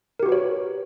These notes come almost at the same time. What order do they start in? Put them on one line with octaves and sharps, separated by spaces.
A#4 G4 F#4 B4 C#5